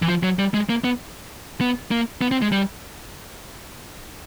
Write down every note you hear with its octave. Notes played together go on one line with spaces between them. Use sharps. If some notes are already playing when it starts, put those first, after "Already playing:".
E3
F3
F#3
G3
G#3
A#3
B3
B3
A#3
B3
C4
G#3
G3